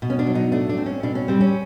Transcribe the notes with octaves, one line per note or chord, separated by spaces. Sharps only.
B2
C#4
D4
F#3
D#4
A3 D4
D4
C4
C#4
B2 D4
C#4
G3 C4
C#4